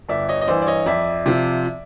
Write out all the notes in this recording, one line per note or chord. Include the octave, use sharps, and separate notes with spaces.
G1 D5 E5
C#5 D#5
D#5
G2 E3 C5 D5
D5
C#5 D#5
F2 D5 E5
C3 F3